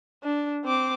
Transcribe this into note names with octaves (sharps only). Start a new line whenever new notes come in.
D4
C4 D6